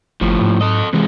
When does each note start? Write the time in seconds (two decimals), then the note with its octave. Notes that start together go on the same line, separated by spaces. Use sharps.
0.21 G1 A2 F3
0.41 G#2
0.61 A4 D#5
0.93 C3 E3 G#3